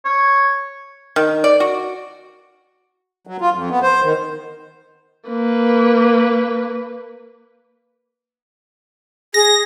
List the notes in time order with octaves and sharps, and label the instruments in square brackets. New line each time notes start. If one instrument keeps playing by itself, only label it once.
[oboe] C#5
[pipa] D#3
D5
F#4
[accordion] F#3
F4
F2
B3
C5
D#3
[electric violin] A#3 B4
[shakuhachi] G#4 [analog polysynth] A#6